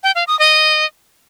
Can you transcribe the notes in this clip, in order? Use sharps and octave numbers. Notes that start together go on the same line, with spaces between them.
G5
F5
D#6
D#5